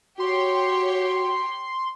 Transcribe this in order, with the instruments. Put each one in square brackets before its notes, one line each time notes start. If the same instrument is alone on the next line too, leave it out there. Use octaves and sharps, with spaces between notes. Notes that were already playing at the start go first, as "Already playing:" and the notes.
[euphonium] F#4 [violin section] G4 C#5 G5 [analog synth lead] C6